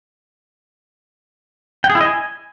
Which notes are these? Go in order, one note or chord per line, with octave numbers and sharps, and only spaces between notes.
G5
G#4
E4
D#5
G#5